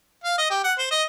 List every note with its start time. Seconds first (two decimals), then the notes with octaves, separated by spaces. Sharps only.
0.24 F5
0.38 D#5
0.50 G4
0.64 F#5
0.78 C5
0.91 D#5